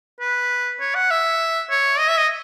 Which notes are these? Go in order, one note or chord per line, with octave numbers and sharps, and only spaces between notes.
B4
C#5
F#5
E5
C#5
D#5
E5
D#5